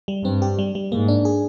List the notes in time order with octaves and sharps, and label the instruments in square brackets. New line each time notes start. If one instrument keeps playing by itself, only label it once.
[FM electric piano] G3
[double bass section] G2 [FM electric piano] C4
[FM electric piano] G4
G3
G3
[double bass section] G#2 [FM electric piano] A#3
[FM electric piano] D4
G#4